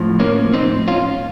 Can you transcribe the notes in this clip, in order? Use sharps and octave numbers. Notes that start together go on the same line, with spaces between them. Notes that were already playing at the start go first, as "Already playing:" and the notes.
Already playing: A2 F3
A#3 C#4
C4 D#4
C#4 F4